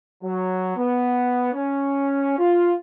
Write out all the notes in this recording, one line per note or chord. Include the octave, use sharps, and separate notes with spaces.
F#3
B3
C#4
F4